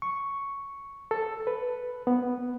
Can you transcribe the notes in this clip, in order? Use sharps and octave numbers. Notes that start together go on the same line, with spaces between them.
C#6
A4
B4
B3